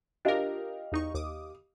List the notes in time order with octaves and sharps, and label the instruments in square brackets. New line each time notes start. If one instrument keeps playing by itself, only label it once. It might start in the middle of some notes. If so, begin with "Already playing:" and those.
[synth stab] D4 F4 A#4 [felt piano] G4 D#5 F5
[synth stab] E2 D#4 C#6
D#2 D6 D#6